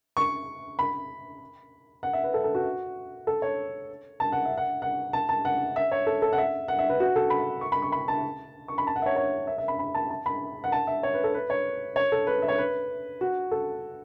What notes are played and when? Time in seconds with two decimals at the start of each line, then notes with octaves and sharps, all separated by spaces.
0.17 C#6
0.79 B5
2.03 F#5
2.13 E5
2.24 B4
2.34 A4
2.44 A4
2.55 F#4
3.27 A4
3.42 C#5
4.20 A5
4.32 F#5
4.45 E5
4.57 F#5
4.82 F#5
5.13 A5
5.29 A5
5.45 F#5
5.76 E5
5.92 C#5
6.07 A4
6.22 A4
6.33 F#5
6.38 E5
6.68 F#5
6.79 E5
6.89 B4
7.00 F#4
7.16 A4
7.30 B5
7.61 C#6
7.72 B5
7.82 C#6
7.92 B5
8.08 A5
8.68 C#6
8.78 B5
8.87 A5
8.96 F#5
9.02 E5
9.06 C#5
9.16 C#5
9.47 E5
9.58 E5
9.68 B5
9.79 B5
9.95 A5
10.10 A5
10.26 B5
10.64 F#5
10.72 A5
10.87 E5
11.03 C#5
11.14 B4
11.24 A4
11.34 B4
11.50 C#5
11.96 C#5
12.12 A4
12.27 B4
12.42 E5
12.48 C#5
12.58 B4
13.21 F#4
13.51 A4